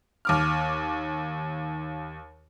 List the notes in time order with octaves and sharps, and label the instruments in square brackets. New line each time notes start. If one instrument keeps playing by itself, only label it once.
[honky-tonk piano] D#2 D6 F6